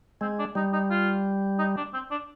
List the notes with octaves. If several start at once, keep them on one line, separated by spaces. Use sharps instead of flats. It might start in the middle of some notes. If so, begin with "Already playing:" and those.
G#3 C4
D4
G3 D#4
D#4
F4
D#4
D4
C4
D4